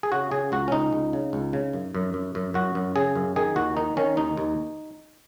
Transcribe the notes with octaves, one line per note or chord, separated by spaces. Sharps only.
G#4
C#3 F#4
C#3 G#4
C#2 F#4
C#4
C#2 D#4
C#2
C#3
C#2
C#3
F#2
F#2
F#2
F#2
F#2 F#4
F#2
C#3 G#4
F#2
D#3 G#4
D#2 F#4
D#3 D#4
D#3 C#4
D#2 D#4
D#2